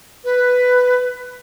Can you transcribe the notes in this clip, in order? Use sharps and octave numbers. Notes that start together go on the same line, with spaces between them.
B4